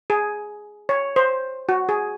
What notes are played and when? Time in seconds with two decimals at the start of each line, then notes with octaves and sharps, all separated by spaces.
0.10 G#4
0.89 C#5
1.16 C5
1.69 F#4
1.89 G#4